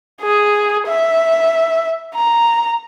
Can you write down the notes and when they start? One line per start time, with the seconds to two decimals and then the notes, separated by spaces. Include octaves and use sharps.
0.22 G#4
0.88 E5
2.15 A#5